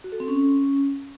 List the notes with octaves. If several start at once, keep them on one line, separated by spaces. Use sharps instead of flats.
F#4
A4
C4
C#4